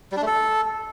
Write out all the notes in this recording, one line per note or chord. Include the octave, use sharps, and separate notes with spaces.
G3
D4
A3
A4